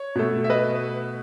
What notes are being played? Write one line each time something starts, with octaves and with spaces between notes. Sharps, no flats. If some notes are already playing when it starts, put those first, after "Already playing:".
Already playing: C#5
B2 A3
E5
B4 D#5